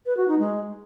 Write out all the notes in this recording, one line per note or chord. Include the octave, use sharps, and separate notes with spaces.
B4
F#4
D#4
G#3